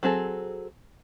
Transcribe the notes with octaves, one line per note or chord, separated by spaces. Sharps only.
F#3 C4 G#4 A4